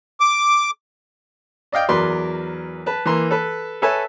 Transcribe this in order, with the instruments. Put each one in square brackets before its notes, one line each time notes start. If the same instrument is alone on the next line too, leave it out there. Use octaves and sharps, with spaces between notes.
[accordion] D6
[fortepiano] D5 D#5 F5 G5
E2 F#3 A#4 B4 D5 C6
B4 A5
E3 A#3 A#5 C6
A4 B4
A4 B4 C#5 E5 G#5 A5